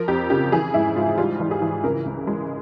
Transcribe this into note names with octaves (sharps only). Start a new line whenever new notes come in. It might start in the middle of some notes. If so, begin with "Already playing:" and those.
Already playing: F3 A#4
F2 G4
C#3 G4
E3 G#4
G#2 E4
G#2 F4
G3 F4
E3
G#4
E3
C#3 A#4
C#2
G#3